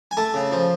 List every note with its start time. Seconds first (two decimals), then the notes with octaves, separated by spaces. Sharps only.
0.11 G#5
0.17 A3 A5
0.34 C#3
0.52 F3